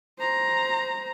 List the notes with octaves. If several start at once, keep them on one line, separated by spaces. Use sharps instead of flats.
C5 A#5